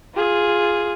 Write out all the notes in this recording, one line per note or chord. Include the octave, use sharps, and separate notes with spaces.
F4 G#4